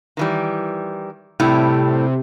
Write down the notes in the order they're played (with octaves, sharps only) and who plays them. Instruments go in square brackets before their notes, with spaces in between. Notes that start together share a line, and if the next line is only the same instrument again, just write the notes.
[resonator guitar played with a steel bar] D#3 E3 G3
[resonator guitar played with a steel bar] A2 G3 E4 [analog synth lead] C3